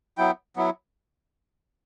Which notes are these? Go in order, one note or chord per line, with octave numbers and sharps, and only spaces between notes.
F#3 B3 E4 G5
F#3 B3 E4